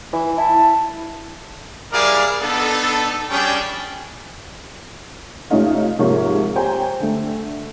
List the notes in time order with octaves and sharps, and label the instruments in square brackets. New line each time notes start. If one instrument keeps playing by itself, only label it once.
[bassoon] E3
[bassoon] E4 [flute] A5
[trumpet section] G3 E4 G#4 A#4 D5 F5
B3 D4 D#4 A4
G3 C#4 D4 G#4 G5
[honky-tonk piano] F1 C3 A3 C#4 D#4 F4
G#2 C3 F3 A#3 C#5
G4 C5 C#5 G5 G#5 A#5
D3 A3